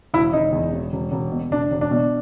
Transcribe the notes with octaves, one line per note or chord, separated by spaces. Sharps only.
E1 E4
E1 D#4
E2
E1
E1
E1
B2
E1 D4
E1
D4
B2